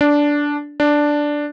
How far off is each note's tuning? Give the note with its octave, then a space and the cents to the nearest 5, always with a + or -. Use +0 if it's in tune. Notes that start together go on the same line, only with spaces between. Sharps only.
D4 -10
D4 +0